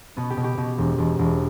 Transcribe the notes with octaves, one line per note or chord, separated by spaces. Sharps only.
B2 B3
G4
B2
G4
B2
E1
E1
E1